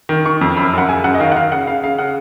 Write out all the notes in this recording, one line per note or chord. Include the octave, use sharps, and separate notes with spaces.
D#3
D#3 C#6
F2
F#2 B5
F#2 F#5
C#3 G#5
F#2 F#5
D#5
D#3 F5
F#5
D#3 F5
C#3 F#5
C#3 F5
C#3 F5
C#3 F#5